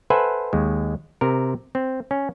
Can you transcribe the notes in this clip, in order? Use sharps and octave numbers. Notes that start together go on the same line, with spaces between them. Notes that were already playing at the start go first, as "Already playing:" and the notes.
A4 B4 C5 E5 F#5 G#5
D#2 G#3
C3 A#4
C4
C#4